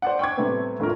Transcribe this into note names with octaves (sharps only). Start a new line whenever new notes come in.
C5 D5 F#5
G5 C#6 D6 G#6
A2 C3 G3 A3 B3 C4
F1 A2 F3 A#4